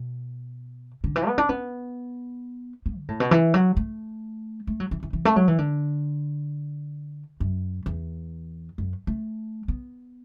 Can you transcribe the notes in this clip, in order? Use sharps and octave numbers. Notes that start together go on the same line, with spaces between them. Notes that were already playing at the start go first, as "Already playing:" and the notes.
Already playing: B2
D3
E3
B3
D4
B3
B3
D3
A2
B2
E3
F#3
A3
A3
F#3
E3
E3
E3
A3
F#3
E3
D3
F#2
E2
F#2
A3
B3